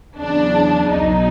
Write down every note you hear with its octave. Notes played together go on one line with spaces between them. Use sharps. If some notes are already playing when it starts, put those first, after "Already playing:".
E2 C#3 F#3 D4
B1 B2 F#3 D#4